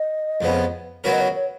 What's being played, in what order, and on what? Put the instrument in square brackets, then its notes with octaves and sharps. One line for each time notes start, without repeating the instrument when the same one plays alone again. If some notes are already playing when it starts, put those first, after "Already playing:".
Already playing: [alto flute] D#5
[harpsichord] F2 C#3 F3 B3
[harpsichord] C#3 F#3 B3 F#4 A#4 [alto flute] C#5
[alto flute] D#5
C#5
C#5